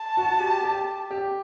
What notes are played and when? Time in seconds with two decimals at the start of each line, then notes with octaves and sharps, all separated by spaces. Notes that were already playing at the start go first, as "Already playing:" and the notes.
Already playing: A5
0.17 F#4
0.40 G4
0.64 G4
1.11 G4